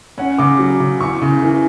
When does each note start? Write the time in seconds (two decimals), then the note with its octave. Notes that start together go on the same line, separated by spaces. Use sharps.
0.18 C#4 F#5
0.38 C#3 D6
0.59 F#3
0.80 C#3
1.01 E2 C#6
1.22 C#3
1.42 E3